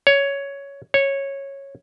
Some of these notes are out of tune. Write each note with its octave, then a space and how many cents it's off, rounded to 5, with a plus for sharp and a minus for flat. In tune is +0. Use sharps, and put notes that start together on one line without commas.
C#5 +10
C#5 -10